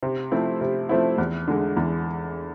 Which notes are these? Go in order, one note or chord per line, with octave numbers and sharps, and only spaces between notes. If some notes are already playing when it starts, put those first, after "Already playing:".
C3
F3 A3 C4 E4
C3
F3 A3 C4 E4
E2
D3 G#3
E2